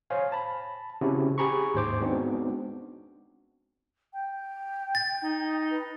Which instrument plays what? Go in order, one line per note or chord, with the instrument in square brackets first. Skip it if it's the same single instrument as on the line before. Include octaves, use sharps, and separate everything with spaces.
[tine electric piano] C5 C#5 F5 G#5
A5 B5
C#3 C4 C#4 E4 F#4 G4
G4 G#4 G#5 A#5 B5 C#6
D#2 G#2 C5 D6
G#3 B3 C4 D4 D#4 F#4
[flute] G5
[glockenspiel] A6
[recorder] D#4
[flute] B4